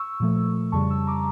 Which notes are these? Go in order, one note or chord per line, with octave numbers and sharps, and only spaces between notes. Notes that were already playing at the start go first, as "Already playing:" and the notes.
Already playing: C#6 E6
A#2 F3 A3
F2 C#3 G3 A5 C#6
C#6 E6
A#5 D6